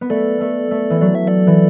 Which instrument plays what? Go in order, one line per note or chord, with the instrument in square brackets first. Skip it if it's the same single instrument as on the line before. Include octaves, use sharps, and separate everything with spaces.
[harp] B3
[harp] A3 [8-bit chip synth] A4 D5
[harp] A3
A3
E3
[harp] F#3 [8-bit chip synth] D5
[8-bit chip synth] E5
A4 D5
[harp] E3